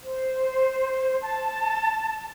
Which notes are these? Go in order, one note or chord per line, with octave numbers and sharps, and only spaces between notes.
C5
A5